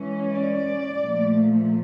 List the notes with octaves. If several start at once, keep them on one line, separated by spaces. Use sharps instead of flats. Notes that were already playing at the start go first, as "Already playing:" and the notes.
Already playing: E3 G#3 C#4
D5
A#2 F3 A3